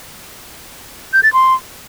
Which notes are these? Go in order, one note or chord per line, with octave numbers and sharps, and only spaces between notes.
G6
A6
C6